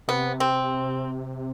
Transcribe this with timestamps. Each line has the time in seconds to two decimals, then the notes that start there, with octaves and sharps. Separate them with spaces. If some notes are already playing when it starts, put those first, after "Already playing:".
0.08 C3 B3
0.40 C4